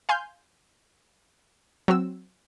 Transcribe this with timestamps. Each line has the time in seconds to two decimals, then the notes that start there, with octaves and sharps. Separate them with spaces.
0.09 F5 G#5 C6 F6 G6
1.88 F#3 C4 F#4 E6